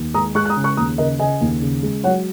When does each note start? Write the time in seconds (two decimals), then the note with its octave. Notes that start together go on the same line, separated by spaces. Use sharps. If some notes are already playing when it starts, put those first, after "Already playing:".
Already playing: D#2
0.14 G#3 A#5 D#6
0.35 G#3 C#6 F#6
0.45 F#6
0.49 A#5 D#6
0.56 C#3
0.64 C#6 F#6
0.77 D#2 A#5 D#6
0.98 C#3 A#4 D#5
1.19 C#3 D#5 G#5
1.41 D#2
1.62 C#3
1.83 G#3
2.04 F#3 C#5 F#5